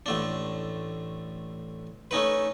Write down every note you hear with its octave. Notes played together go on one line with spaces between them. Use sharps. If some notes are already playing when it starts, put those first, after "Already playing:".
A1 A3 D4
A3 C#4 D#4 B4